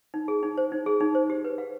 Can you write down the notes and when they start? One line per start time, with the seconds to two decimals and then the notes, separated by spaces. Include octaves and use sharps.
0.14 D#4
0.28 G#4
0.43 D#4
0.58 C5
0.72 D#4
0.86 G#4
1.00 D#4
1.15 C5
1.30 G4
1.44 B4
1.58 F5